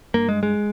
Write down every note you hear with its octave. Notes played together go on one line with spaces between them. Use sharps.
G2 A#3
G#3
G#3